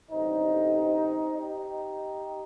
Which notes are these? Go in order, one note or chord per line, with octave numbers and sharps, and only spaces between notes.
A1 G2 D3 G3 C4 D#4
D#4 G4